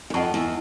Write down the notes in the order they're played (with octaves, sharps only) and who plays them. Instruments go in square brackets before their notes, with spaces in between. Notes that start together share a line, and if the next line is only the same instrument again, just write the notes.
[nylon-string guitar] F#2
[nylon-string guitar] F2 [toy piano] D#5 F#5 A5 C#6
[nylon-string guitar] E2